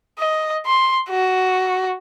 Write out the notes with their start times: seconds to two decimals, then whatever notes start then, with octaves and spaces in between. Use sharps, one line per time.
0.19 D#5
0.66 C6
1.09 F#4